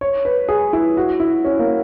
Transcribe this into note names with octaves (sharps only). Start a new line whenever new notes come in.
C#5
B4
G#4
E4
F#4
E4
C#4
A#3